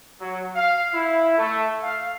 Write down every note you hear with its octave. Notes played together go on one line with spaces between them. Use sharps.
F#3
F5
E4
A3
F5